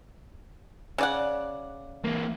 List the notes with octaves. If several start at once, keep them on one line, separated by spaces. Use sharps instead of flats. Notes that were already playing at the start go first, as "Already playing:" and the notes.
C#3 D5 F#5
E3 A#3